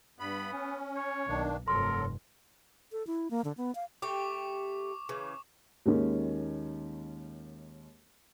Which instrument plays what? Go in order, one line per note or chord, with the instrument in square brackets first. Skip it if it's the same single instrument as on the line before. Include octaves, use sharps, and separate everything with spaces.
[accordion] G2 B5 [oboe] B3
[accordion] C#4
[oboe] C#5
[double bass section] B1 [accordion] D#3 A#3 D4
[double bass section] F1 G2 [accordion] F#3 A4 [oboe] A#4 [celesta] C6
[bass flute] A4
E4
A#3
D3
B3
F5
[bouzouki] A3 G4 [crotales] C#6 D6
[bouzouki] C#3 E3
[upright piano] D#2 D#3 G#3 A#3 C#4